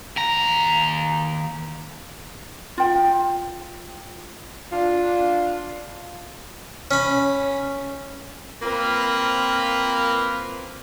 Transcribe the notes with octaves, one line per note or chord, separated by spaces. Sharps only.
D#2 A#5
F4 G5
D4 F4
C#4 B5
A#3 C4 F4 A#4 B4